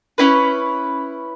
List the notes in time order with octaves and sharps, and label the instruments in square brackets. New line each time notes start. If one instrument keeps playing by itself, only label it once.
[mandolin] C#4 E4 B4